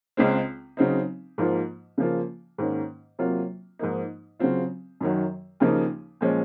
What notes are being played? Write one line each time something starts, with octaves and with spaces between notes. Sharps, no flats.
C#2 C#3 G#3 C4
C#3 F#3 C4 D#4
G#2 F3 A#3 F4
C#3 F3 A#3 F4
G#2 D#3 A#3 C#4
C3 F#3 A#3 F4
G#2 F3 A#3 D#4
C#3 F#3 C4 F4
F#2 D#3 F#3
D#2 C#3 F3 A#3 D#4
A#2 F3 G#3 C#4